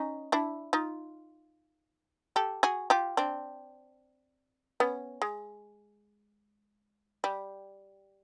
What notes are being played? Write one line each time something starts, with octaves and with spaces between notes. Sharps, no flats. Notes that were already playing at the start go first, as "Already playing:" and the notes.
Already playing: C#4 D#4
D4 E4
D#4 F4
G4 A4
F#4 G#4
F4 G4
C4 D4
B3 C#4
G#3
G3